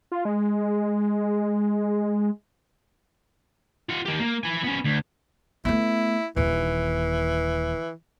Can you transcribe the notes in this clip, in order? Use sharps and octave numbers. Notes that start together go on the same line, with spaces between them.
F4
G#3
F4 F#5
D#3 G4
A#3
E4 G#5
B3 C#4
D2
A3 B3 E4
D#1 D#2 E3